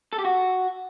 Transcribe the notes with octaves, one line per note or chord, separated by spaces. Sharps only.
A4
G4
F#4